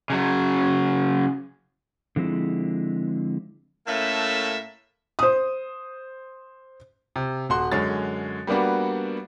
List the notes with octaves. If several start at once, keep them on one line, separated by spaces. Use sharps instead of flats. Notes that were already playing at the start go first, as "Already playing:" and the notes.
C#3 F#3
D3 F3 G#3 C4 E4
A2 A3 A#3 C#4 E5 A5
C5 D#6
C3
D#1 F#4 C6 F#6
F#2 D3 G#3 C#5 A6
G3 A#3 B3 D4 F#4